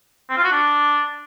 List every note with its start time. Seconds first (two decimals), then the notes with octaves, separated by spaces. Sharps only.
0.29 C4
0.37 F4
0.44 F#4
0.51 D4